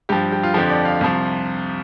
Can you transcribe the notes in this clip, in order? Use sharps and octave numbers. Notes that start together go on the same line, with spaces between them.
G2 F3 G4
G4
F4
F2 D3 F3 G4
D5
F5
C2 C3 F3